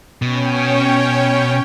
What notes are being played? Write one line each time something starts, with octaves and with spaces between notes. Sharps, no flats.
B2 C#4 C#5 G5